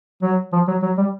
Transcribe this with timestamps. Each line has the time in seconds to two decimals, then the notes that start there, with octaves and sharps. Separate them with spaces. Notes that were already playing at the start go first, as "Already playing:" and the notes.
0.22 F#3
0.53 F3
0.67 F#3
0.82 F#3
0.98 G3